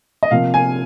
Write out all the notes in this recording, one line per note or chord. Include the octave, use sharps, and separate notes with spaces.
D#5
C3 F3 A#3 F5
G#5